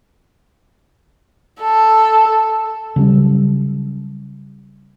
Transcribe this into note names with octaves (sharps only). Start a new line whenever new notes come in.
A4
C#3 F#3 G3 C#4